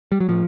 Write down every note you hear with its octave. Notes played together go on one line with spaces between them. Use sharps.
G3
F#3
A2 F3